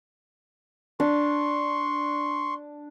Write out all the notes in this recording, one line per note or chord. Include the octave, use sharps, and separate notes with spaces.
D4 C6 C#6